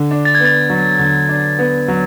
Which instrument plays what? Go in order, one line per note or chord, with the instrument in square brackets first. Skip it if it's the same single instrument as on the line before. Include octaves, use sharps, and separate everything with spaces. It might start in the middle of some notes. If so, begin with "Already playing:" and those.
Already playing: [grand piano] D3
D4
[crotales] A6
G#6
[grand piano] B3 [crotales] A6
[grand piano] F#3
D3
D4
B3
F#3